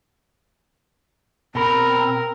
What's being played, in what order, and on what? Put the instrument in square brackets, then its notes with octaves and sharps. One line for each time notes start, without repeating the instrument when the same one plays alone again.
[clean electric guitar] B2 B5 [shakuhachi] C4 [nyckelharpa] A#4 [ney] A#5